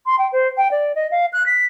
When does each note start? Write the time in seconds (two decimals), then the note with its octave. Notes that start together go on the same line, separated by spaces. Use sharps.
0.06 C6
0.18 G5
0.32 C5
0.57 G5
0.71 D5
0.95 D#5
1.11 F5
1.33 F#6
1.46 B6